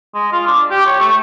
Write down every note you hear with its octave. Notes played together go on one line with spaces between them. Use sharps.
G#3
F4
D4
G4
C#5
A3